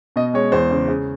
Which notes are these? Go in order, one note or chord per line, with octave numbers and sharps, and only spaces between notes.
B2 D#5
G#3 C#5
E2 C5
C#3
C#3